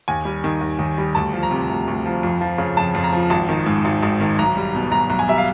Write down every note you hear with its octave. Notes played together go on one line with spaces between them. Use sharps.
D#2 G#5
G3
D#3
D#2
D#2
G3
D2 A5
F3
A#5
C3
D2
D2
F3
F2
F3
C#3
F2 A5
F2
A#5
F3
G#1 A5
D#3
G#2
G#1
G#1
D#3
B1 A#5
G3
B2
B1 A#5
B1
G#5
G3 E5
F5